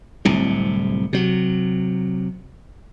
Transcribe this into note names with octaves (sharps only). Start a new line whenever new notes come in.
D1 C2 C3
C3 F#3